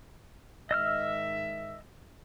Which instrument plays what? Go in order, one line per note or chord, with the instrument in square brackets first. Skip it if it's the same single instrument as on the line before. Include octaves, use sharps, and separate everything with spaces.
[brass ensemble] G#2 D#3 E5 [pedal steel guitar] D#5 E6 F6